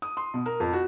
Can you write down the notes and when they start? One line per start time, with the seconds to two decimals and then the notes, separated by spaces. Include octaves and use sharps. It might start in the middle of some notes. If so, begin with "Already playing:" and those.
0.02 D#6
0.17 C6
0.34 B2
0.46 A#4
0.60 F2
0.73 F#4